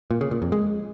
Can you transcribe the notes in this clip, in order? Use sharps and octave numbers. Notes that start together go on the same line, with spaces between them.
A#2
C#3
A#2
F2
G#3